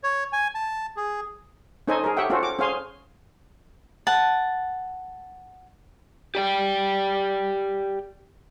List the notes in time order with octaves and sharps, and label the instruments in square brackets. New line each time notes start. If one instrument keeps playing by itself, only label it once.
[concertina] C#5
G#5
A5
G#4
[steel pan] C#4 D#4 A4 C5 D#5 G#5
G#4 A#4
G4 A4 C#5 E5 F#5 G5
C#4 F4 F#4 A4 C5
D6
C#4 G#4 C5 F5 G#5 C6
[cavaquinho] F#5 A5
[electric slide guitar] G4 D5 G5